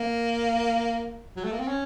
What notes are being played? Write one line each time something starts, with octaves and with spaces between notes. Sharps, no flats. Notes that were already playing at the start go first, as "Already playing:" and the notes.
Already playing: A#3
F#3
A3
A#3
C4
C#4